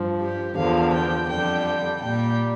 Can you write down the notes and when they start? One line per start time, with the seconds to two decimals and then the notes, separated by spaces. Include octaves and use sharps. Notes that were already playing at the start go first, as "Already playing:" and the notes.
Already playing: G2 F3
0.21 G4
0.56 E2 D3 F3 F5
0.93 G5
1.28 F2 D3 G3 G5
1.64 G5
2.00 A#2 G3 G5